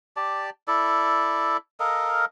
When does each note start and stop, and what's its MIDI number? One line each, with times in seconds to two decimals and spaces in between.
0.16 0.50 67
0.16 0.50 74
0.16 0.50 81
0.68 1.57 64
0.68 1.57 69
0.68 1.57 74
1.80 2.25 69
1.80 2.25 70
1.80 2.25 75
1.80 2.25 77